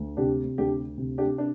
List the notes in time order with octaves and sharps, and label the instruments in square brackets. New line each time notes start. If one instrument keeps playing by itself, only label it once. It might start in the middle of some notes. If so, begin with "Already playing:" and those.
Already playing: [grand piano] D2
[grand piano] C3 [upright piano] D4 G4
[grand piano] D2 [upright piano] D4 G4
[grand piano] C3
[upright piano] D4 G4
D4